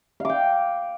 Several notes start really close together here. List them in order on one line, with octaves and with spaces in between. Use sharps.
F5 D6 G5